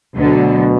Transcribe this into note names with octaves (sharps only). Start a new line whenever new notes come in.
D2 B2 D3 F#3